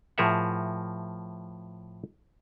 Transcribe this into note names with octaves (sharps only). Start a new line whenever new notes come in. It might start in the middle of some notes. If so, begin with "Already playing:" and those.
A2 F3 G#4 A#4 E5 F#5